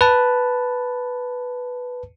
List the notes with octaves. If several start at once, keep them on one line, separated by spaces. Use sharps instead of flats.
B4 A5